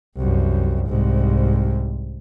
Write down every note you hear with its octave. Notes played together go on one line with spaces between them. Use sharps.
C2 F#2
C2 G#2